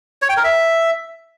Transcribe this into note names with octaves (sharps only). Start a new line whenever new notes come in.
C#5
G5
A#4
E5